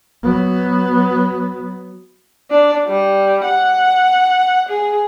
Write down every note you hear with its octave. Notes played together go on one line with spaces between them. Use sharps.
F#3 B3
D4
G3
F#5
G#4